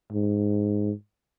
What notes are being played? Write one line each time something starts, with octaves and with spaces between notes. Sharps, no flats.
G#2